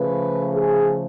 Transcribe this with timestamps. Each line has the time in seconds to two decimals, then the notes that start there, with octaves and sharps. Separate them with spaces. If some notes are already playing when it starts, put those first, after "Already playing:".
Already playing: C#3 F3 A3 B4
0.52 G#4